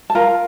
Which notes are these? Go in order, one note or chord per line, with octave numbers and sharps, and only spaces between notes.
A5
F4 A#4 A#5